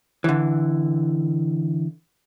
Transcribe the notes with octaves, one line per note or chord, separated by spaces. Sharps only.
D3 E3